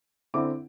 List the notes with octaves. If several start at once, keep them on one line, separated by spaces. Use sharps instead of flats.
D3 C4 E4 D6